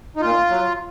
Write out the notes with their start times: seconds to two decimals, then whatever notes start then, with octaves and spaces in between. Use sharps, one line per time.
0.16 D#4
0.21 A#2 F4
0.50 F#3